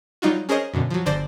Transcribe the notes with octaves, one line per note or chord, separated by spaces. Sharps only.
F#3 G3 D#4 F4 F#4
C#4 G#4 A#4 C5 C#5 D#5
F#2 B2 D3
F3 F#3
G1 D3 C5 D5 A#6 D7